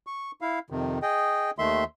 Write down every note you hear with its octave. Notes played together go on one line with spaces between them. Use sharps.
C#6
E4 F5
F2 C3 D#3
G#4 D#5 G5
D#2 D#3 A3 E5 C6